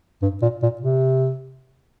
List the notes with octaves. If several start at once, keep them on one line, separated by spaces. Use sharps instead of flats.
G2
A#2
A#2
C3